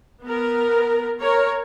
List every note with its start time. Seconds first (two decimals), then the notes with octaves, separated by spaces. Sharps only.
0.22 B3 A#4
1.20 A#4 C#5